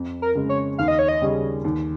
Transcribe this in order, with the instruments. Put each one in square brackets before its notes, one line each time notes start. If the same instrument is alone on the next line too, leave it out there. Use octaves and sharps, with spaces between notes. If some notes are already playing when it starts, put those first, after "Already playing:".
Already playing: [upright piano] F2
[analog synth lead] A#4
[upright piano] C#3 G#3
[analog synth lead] C#5
[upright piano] D#2 [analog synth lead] F5
[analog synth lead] D#5
C#5
D#5
[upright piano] C#3 G3 C#4 G#4
D#2